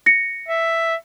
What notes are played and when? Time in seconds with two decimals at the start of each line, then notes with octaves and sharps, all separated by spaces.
0.06 A#6 C#7
0.49 E5